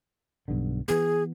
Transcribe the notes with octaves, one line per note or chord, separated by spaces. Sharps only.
B1 G2 D3
E3 B3 G#4